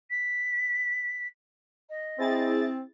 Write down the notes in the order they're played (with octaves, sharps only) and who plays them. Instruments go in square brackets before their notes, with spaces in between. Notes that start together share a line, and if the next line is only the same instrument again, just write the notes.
[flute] B6
D#5
[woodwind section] C4 [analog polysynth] E4 G#4 A6